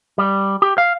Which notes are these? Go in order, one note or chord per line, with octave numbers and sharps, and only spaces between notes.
G3
G4
F5